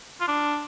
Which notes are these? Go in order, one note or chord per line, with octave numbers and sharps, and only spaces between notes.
F4
D4